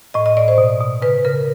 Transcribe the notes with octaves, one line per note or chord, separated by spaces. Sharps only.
A2 D#5
D#5
A2 D5
C5
B2
B2
C#3 B4
C#3 A#4